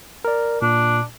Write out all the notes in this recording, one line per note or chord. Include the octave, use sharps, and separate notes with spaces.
A#4 D5
A#2 D4